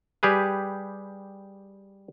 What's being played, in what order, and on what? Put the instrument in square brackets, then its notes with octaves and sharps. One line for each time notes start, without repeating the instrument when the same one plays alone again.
[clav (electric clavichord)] G3 G4 G#4 B4